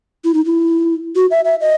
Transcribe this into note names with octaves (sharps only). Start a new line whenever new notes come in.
E4
D#4
E4
F#4
E5
E5
D#5